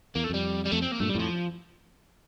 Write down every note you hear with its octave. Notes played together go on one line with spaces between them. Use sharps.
E2 A#3
A3
F2 G3
G3
F2 A3
C4
A#3
G2 A#2 A3
G3
F2 A2 F3